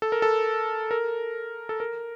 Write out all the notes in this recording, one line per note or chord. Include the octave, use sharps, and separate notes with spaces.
A4
A#4
A4
A#4
A4
A#4